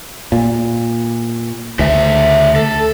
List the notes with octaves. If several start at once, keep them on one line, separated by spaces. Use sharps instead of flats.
A#2
D2 C#3 A3 E5
A4